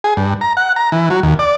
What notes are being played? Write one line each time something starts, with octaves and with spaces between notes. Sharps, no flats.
G#4
G2
A#5
F#5
A#5
E3
F#3
D#2
D5